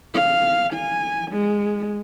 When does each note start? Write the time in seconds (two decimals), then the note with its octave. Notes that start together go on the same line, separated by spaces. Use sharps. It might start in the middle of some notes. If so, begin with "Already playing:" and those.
0.14 F5
0.73 G#5
1.31 G#3